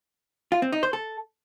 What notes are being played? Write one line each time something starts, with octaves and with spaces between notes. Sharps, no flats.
F4
C4
D#4
C5
A4